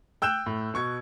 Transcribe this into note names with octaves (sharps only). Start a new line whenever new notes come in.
G5 E6 F#6 G6 E7
A2
B2 C#6 G#6